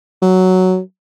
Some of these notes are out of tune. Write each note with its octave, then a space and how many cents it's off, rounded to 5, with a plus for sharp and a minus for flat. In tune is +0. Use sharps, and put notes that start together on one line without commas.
F#3 +5